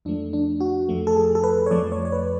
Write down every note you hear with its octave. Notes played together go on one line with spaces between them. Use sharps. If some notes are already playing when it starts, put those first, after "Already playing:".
F2 F3 A3 D4
D4
F#4
F2 F3 A3
A4
G#4
A4
B4
C#5
F2 F3 A3 D5
C#5
C#5
B4